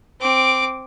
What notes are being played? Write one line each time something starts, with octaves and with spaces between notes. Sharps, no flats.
C4 D6